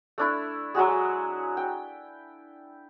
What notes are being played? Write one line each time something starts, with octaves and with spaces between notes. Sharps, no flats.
A3 D4 E4
F#3 G#3 F#4 G#4
G5